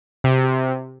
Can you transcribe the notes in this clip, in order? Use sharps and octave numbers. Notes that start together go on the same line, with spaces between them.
C3